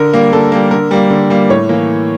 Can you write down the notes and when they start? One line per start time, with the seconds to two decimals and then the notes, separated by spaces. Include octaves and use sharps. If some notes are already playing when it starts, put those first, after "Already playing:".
Already playing: D3 A#4
0.13 G3 A#3
0.33 D3 A4
0.52 G3 A#3
0.71 D3 A#4
0.91 G3 A#3
1.10 D3
1.30 G3 A#3
1.49 A2 C#5
1.69 E3 A#3